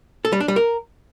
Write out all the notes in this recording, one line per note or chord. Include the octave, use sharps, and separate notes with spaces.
A4
G3
D4
G3
A#4